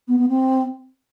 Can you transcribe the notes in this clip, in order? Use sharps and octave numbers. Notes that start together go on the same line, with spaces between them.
B3
B3
C4